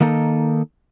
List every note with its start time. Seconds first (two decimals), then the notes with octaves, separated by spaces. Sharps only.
0.01 D#3 A#3 D#4 A4